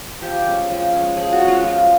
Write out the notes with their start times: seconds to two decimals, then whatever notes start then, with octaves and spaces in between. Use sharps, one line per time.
0.22 F3 G4
0.45 G#3 C#4
0.70 F3
0.93 G#3 C#4
1.17 F3 G#4
1.33 F#4
1.40 G#3 C#4
1.48 F4
1.64 F3 F4